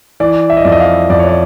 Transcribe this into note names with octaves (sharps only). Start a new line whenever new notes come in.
E3 D5
E5
D#5
F2 D5
D#5
F5
F2 D5
C#5
D5